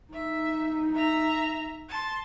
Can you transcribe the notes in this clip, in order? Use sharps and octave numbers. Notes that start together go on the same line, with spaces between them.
D#4 E5
E5 A#5
A5 C6